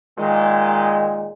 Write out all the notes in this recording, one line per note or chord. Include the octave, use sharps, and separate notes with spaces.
A#2 D#3 G#3